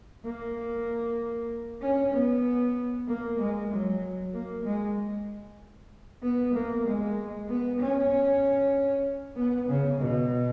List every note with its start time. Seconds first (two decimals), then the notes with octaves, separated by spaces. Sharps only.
0.24 A#3
1.82 C#4
2.13 B3
3.07 A#3
3.39 G#3
3.71 F#3
4.33 A#3
4.65 G#3
6.22 B3
6.54 A#3
6.85 G#3
7.48 B3
7.80 C#4
9.36 B3
9.68 C#3
10.00 B2